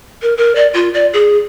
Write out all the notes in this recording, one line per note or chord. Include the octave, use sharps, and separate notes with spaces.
A#4
A#4
D5
F4
D5
G#4